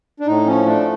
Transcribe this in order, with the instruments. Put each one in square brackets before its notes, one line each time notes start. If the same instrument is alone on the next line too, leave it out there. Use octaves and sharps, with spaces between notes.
[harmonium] D4
A2 D#4
F3 C#4
A3 D4